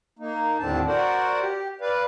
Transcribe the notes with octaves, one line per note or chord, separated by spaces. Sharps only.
A#3 D#4
D#2 A2 D3 C4 D4 A5
F#4 A#4 C5 D5 F#5
G4
B4 D5 F5